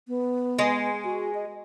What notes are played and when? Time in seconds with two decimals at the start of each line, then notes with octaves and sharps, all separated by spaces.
0.08 B3
0.59 G#3
1.05 F#4
1.35 D#5